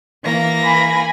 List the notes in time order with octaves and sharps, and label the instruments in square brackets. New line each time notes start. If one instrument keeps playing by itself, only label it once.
[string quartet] E3 A#3 A#6
[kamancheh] G#5 B5